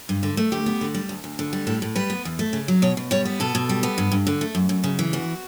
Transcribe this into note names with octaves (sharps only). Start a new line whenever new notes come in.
G2
D3
A3
D2 G4
B3
D3
G3
D2
D2
D3
G3
A2 A4
A2
G3 B4
B3
E2
A3
C#3
F#3
B2 C#5
B2
G3 C#5
B3
B2 A4
B2
G3
B3
G2
G2
D3
A3
F#2
F#2
C#3
E3
E2 F#4